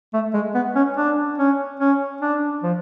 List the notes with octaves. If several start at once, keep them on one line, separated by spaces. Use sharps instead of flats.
A3
G#3
B3
C#4
D4
C#4
C#4
D4
F3